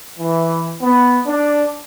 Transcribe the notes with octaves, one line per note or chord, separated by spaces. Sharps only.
E3
B3
D4